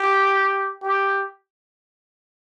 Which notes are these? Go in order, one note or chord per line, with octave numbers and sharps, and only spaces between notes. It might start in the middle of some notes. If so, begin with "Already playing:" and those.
Already playing: G4
G4